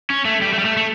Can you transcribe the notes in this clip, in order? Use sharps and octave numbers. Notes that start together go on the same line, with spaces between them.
C#4
A3
G3
A3
G3
A3
A3